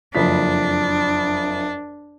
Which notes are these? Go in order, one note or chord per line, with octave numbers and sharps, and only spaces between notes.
F#1 F2 D4 B6